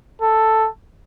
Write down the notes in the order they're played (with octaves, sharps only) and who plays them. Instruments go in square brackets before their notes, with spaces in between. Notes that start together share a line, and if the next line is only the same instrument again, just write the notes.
[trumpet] A4